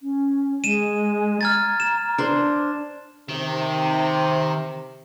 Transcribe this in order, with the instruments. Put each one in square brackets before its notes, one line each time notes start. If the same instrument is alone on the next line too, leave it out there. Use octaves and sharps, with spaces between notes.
[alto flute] C#4
[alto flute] G#3 [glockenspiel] D#7 E7
[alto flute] A#5 [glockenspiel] F6 G#6 A6
[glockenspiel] E7
[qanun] D4 C5
[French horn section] C3 [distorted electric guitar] D#3